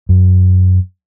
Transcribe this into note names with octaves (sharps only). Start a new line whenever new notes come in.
F#2